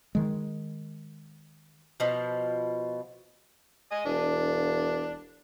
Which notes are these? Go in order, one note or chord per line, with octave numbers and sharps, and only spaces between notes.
D#3 G#3
B2 F3
D#5 G#5
E1 D4